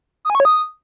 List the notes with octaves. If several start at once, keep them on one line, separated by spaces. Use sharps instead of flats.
D#6
G#5
C#6
C#5
D#6